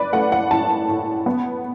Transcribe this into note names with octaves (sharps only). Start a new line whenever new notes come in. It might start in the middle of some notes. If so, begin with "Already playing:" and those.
Already playing: B4 D5
A3 F#5
F#5
A2 A5
A2
B3